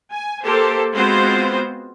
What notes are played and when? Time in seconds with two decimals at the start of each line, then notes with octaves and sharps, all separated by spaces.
0.11 G#5
0.43 A#3 G4 A4 C5
0.93 G#3 B3 C4 F4 F#4 C5